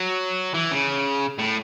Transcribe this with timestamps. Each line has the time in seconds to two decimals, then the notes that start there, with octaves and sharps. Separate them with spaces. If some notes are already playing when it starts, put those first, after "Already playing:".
Already playing: F#3
0.54 E3
0.71 C#3
1.38 A2